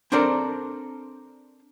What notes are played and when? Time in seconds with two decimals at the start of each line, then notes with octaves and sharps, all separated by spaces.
0.12 C4 D4 A4 A#4 C5 D5